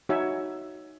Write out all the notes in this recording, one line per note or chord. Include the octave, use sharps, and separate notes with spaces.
D#4 F#4 C#5 E5 G#5